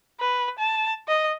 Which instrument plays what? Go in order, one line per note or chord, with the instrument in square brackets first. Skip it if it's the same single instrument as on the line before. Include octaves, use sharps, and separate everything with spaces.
[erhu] B4
A5
D#5